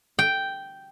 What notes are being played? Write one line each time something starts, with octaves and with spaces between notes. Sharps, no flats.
G5